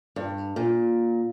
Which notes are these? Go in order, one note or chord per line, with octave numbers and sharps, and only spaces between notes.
G2
A#2